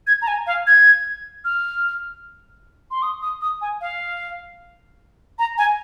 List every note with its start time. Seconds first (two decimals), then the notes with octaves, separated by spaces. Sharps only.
0.07 G#6
0.22 A#5
0.28 G#5
0.47 F5
0.67 G#6
1.45 F6
2.91 C6
3.02 D#6
3.22 D#6
3.41 D#6
3.61 G#5
3.81 F5
5.39 A#5
5.58 G#5